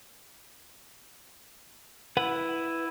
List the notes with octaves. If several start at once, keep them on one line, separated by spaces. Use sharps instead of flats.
E4 B4 F#5